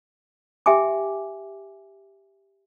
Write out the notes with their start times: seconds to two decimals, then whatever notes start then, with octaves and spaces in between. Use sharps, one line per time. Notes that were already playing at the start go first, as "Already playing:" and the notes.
0.66 G4 E5 G5 G#5 D6